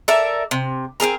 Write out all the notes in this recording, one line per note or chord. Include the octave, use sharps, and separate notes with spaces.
A4 A#4 D5 E5
C3
C4 C#4 G#4 A#4